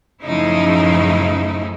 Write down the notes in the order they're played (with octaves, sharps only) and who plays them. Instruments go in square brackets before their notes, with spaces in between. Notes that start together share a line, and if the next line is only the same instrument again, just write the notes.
[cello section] F#2 A2 C#3 F3 D#4 E4